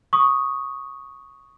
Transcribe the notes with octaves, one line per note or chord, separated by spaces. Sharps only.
C#6 D#6